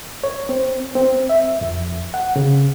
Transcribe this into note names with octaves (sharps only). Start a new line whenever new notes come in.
C#5
C4
C4
E5
F2
F#5
C#3